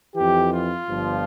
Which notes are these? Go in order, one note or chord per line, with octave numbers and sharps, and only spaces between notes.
F2 E3 G4
F4
G1 G2 F3